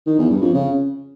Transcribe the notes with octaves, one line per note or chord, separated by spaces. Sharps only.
D#3
E2
G2
F2
C#3